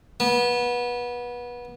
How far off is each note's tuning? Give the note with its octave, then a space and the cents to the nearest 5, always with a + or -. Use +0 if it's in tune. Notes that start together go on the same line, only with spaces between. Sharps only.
B3 -25